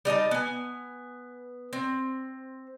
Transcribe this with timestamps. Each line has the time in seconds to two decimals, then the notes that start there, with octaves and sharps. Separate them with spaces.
0.05 G3 D#4 D#5 A5
0.31 B3 G#5
1.73 C4